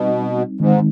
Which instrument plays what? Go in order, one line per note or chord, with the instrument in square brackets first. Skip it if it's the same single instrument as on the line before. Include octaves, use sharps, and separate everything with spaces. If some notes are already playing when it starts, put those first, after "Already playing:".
Already playing: [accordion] B2 [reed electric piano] G3 C4 D#4
[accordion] G#2 [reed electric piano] D#3 G#3 C4 D#4